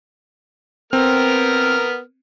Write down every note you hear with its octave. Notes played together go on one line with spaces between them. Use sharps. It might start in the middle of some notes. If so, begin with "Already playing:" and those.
B3 C4 A#4 F6